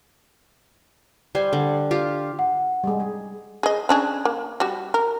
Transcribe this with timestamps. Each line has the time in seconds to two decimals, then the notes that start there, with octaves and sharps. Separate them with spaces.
1.35 G3 C5 G#5
1.53 D3
1.91 F4 G4
2.39 F#5
2.84 G3 G#3
3.00 G#4
3.63 G#4 D#5
3.89 C#4 D4 G#4
4.25 A#3
4.60 G3 F#4
4.94 A#4